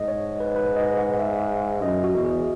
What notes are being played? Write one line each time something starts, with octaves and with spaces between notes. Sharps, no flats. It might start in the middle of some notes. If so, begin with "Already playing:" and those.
Already playing: G#2 D#5
C#5
B4
B4
D#5
F#5
E5
F#2 D#5
F#4
E2
G#4